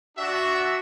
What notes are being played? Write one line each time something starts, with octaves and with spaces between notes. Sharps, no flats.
D4 F#4 E5